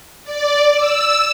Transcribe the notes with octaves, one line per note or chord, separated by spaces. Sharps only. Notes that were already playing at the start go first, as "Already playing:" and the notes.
D5
E6